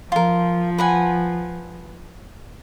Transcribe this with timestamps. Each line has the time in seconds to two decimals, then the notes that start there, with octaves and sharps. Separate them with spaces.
0.12 F3 F4 A#4
0.78 B4 F#5 G#5